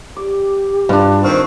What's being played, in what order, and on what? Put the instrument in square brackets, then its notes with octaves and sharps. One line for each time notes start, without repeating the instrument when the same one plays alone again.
[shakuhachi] G4 [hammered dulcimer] D5
[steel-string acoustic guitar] G2 [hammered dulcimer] D4 F4
[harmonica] D#3 C4 [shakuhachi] C5 [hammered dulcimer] F5 C#6